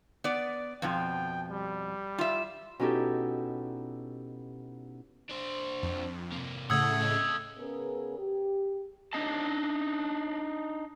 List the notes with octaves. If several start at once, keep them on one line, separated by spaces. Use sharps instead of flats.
B3 D5
F2 B2 F3 G5
G3
F4 E5
B2 C#4 D#4 E4 G4 A4
D4 C5
F2
C3 A#3
A2 C#3 A3 F#5 D#6 E6 G#6
A4 D#5
C#3 B3 C#4 G#4 A#4 B4
G4
D4 D#4 D#5 A5